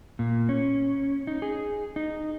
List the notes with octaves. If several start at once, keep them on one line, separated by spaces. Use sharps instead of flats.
A#2
C#4
D#4
G#4
D#4